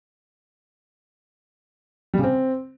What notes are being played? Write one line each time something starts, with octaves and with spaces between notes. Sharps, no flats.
G3
C#3
C4